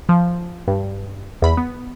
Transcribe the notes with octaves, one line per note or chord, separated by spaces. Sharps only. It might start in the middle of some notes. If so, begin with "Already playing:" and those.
F3
G2
E2 B5
B3